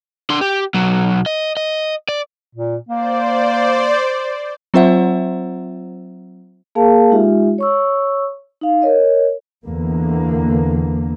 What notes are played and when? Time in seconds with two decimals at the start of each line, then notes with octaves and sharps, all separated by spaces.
0.30 D4 C6
0.41 G4
0.74 B1 F#3
1.26 D#5
1.57 D#5
2.09 D5
2.55 A#2
2.89 A#3 C5 D5
4.74 F#3 C4 F4 C5 E5 F#5
6.75 A#3 G#4 A#4 F5 A5
7.11 G#3 D#4 F4 G4 E5
7.58 C#5 C#6 E6
8.61 D#4 F5
8.82 A#4 C#5 D#5
9.65 E2 D3 A#3